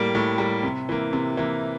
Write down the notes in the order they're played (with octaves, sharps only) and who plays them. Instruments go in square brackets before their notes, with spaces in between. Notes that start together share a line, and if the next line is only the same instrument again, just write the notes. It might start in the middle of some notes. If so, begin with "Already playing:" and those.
Already playing: [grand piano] A2 G3 A#3
A2
G3 A#3
C3
E3 A#3
C3
E3 A#3